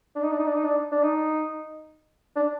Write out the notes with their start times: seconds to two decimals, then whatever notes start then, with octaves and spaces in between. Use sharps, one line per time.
0.15 D4
0.23 D#4
0.32 D4
0.39 D#4
0.47 D4
0.55 D#4
0.63 D4
0.92 D4
1.03 D#4
2.36 D4